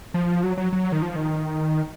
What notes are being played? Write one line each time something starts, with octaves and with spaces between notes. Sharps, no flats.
F3
F#3
F#3
F#3
D#3
F3
D#3